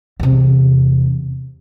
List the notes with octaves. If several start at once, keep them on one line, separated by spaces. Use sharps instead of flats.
E2 C3